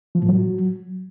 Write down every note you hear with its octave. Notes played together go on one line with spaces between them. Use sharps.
F3
A2
F#3